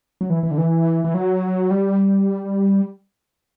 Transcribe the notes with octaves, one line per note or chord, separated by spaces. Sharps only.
F#3
E3
E3
D3
E3
E3
F#3
G3